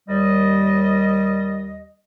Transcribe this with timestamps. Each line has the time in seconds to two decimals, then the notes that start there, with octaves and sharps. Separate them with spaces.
0.09 D#2 G3 D#5